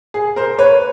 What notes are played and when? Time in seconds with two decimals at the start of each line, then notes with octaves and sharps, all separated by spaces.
0.14 G#4
0.36 A#4 C5
0.59 B4 C#5